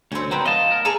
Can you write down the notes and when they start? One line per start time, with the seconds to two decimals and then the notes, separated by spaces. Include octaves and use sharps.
0.12 D2 C4 C#4
0.31 D#3 F#3 B3 C4
0.46 D#5 F5 A5
0.72 A#4
0.85 G#4 A4 G#5 A#5